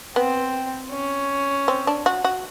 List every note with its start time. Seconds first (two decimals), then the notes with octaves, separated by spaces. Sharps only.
0.16 B3 C4
0.92 C#4
1.68 C4
1.87 D4
2.06 F#4
2.24 F#4